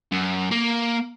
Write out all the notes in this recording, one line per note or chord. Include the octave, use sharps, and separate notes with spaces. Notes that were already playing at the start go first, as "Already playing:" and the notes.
F#2
A#3